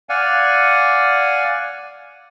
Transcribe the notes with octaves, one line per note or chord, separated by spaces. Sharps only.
D5 F5 F#5 G#5